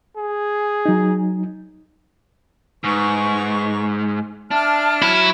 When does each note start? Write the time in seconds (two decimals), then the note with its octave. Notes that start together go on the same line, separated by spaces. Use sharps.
0.17 G#4
0.86 F#3 D#4
2.84 G#2 D#4 B4 C#6
4.51 D4 E5 A5 F6
5.02 F#3 E4